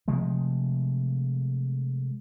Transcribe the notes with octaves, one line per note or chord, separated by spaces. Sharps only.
C3 F3 G#3 A3